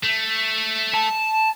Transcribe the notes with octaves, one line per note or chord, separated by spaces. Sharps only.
A3
A5